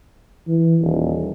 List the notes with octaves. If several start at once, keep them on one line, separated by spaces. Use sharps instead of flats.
E3
D#1